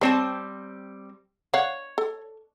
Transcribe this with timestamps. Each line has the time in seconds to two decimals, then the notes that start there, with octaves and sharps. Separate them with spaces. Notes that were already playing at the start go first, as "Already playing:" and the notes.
0.01 G3 C4 C5 C#5 A5
1.54 C#5 F5 F#5
1.98 A4